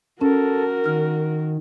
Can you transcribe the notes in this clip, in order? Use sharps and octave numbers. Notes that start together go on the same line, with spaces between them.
C#4 F#4 A4 A#4
D#3 F6